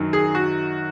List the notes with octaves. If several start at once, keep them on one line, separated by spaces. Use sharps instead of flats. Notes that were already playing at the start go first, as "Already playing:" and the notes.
Already playing: F#2 D#3 F#3
G#4
F#4